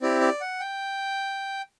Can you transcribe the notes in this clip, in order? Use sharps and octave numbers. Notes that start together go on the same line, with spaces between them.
C4 E4 G4 D5
D5
F#5
G5